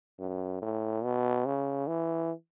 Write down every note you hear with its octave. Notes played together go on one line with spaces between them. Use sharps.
F#2
A2
B2
C#3
E3